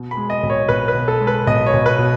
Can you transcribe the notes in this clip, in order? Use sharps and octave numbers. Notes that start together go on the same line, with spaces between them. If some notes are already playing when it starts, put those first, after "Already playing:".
Already playing: B2
B5
G#3
D#5
B1
C#5
B1 B4
B4
B2
A4
G#3
B4
B1 D#5
C#5
B1
B4
B2